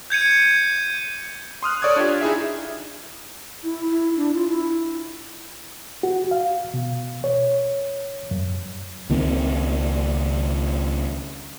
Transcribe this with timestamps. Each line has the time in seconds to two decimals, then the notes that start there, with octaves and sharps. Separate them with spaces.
0.10 G6 G#6 C#7 D#7
1.63 C6 D#6 F6 F#6
1.82 A4 C#5 D5 C#6 D#6 G#6
1.96 D4 F4 G4
2.21 D#4 E4 G#4 E5
3.64 E4
3.91 E4
4.16 D4
4.34 F4
4.49 E4
6.03 F#4
6.31 F5
6.74 B2
7.24 C#5
8.31 F#2
9.10 C#2 D#3 A#3 C4